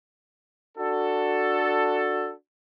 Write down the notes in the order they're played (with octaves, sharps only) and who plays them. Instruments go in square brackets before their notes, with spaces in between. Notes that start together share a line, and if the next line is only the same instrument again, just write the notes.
[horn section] D4 F#4 A4